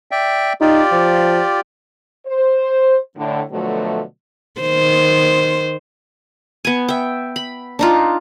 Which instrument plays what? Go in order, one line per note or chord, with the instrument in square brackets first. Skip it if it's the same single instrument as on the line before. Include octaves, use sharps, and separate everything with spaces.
[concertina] D5 E5 G5
[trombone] D#4 [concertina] F4 G4 D5
[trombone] F3
[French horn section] C5
A2 D3
B2 D3 F3 F#3 A3
[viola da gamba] D#3 C5
[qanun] B3 G#5
E5 G5
B5
D4 D#4 F4